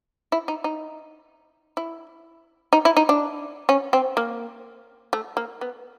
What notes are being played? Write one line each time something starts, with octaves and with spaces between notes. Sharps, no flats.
E4
D#4
D#4
E4
D#4
E4
D#4
D4
C#4
C4
A#3
A3
A#3
B3